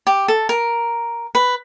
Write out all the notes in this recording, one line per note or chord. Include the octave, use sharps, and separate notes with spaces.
G4
A4
A#4
B4